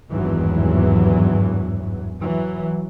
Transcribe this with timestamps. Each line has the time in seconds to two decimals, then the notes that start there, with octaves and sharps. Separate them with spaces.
0.12 G#1 E2 G2 E3 F#3
2.20 E3 F#3